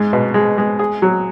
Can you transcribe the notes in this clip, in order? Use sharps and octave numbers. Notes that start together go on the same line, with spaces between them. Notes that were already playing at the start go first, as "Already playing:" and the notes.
Already playing: G#2 G#3
B2
G#3
G#3
G#4
F#3